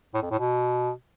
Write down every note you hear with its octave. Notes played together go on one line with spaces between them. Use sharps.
A2
F2
A2
B2